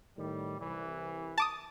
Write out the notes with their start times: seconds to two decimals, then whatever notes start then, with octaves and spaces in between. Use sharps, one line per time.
0.18 A2 D#3 G3
0.60 C2 E3
1.38 A5 D6 D#6